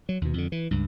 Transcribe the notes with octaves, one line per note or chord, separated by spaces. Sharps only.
F#3
D#2 B2
F2 D3
E3
C#2 G2